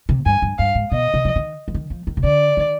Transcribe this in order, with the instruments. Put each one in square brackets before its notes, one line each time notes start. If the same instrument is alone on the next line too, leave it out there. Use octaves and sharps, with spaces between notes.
[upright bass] C3
[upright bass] G2 [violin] G#5
[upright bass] G2
[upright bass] G2 [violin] F5
[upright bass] G#2
[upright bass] B2 [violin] D#5
[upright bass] C3
F3
D#3
F3
D#3
F3
D#3
C3
[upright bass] D3 [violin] D5
[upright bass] D#3